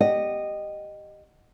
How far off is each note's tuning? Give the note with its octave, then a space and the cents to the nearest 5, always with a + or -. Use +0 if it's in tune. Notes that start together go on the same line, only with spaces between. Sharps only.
G4 -5 D#5 -15 F#5 +0